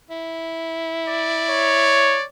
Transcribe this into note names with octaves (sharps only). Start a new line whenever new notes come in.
E4
D5
C#5